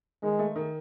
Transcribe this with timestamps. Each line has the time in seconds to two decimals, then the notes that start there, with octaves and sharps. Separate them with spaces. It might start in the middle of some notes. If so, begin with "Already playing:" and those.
0.23 D#3 G#3
0.39 A3
0.56 D#3